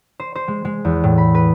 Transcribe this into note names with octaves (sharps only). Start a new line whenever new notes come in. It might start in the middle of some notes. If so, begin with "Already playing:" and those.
C5
C5
G#3
G#3
E2
A2
B5
B4